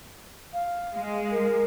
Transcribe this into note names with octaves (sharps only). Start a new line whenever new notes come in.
F5
G#3
A#4